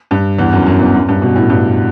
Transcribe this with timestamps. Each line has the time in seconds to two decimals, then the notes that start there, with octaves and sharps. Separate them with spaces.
0.11 G2
0.39 E2
0.52 F#2
0.67 F#2
0.80 E2
0.94 F#2
1.09 G2
1.22 B2
1.35 A2
1.50 G2